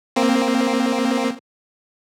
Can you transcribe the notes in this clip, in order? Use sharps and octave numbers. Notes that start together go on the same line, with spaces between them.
A#3 C4